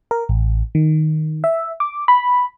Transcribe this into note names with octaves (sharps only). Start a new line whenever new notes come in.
A#4
A1
D#3
E5
D6
B5